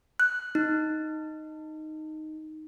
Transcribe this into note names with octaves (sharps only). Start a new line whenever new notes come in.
F#6
D#4